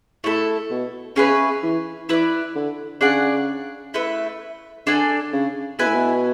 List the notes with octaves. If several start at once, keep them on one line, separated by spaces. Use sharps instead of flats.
A2 A3 E4 A4
B2
C#3 C#4 G#4 B4 E5
E3
E3 E4 B4 D5
D3
C#3 D4 G#4 D5 F#5
A3 E4 B4 E5
D3 D4 A4 D5 G#5
C#3
B2 E4 B4 E5 G#5
A2
B2